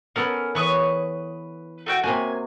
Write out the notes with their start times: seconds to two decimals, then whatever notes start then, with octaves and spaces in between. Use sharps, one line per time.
0.16 B3 C#4 A4 A#4
0.55 E3 B4 C#5 C#6 D#6
1.86 A3 F#4 G5
2.04 C3 A#3 F#4 G#5